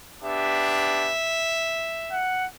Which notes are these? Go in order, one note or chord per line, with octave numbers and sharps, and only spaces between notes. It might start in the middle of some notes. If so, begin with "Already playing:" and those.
B3 D4 G4 E5
F#5